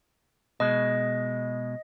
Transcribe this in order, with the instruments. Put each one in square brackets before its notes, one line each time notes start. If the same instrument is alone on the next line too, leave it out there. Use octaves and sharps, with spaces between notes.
[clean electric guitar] B2 G#3 [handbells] D#5